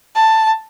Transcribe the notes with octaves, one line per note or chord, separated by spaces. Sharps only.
A5